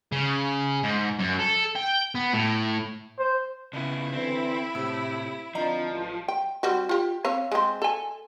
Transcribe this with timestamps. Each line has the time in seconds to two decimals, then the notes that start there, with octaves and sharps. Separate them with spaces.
0.12 C#3
0.84 G#2
1.20 F#2
1.40 A4
1.76 G5
2.15 B3
2.34 A2
3.19 C5
3.73 C#3 B3 E4
4.12 D3 E3 C4
4.75 A2 C3 E6
5.55 D3 F3 C4 D4 D#5 A#5
5.91 A1
6.28 G5
6.63 G3 C4 F#4
6.89 F4 G4
7.25 C4 C#5 F5
7.52 G#3 C4
7.82 A4 G#5